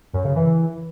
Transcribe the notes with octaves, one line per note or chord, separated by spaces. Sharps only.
F#2
C#3
E3